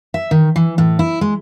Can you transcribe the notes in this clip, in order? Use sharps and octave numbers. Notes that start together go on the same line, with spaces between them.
E5
D#3
E3
A2
E4
G#3